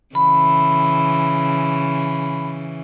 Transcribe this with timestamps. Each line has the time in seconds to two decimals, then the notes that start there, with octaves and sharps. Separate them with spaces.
0.15 C#3 E3 B5